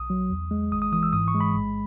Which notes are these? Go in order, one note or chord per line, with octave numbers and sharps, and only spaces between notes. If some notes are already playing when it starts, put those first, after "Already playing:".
Already playing: B1 D#6
F#3
E2
G#3
G#1 D#6
D#6
E3 D#6
E6
G#2 D#6
C#6
G#3
B5
A1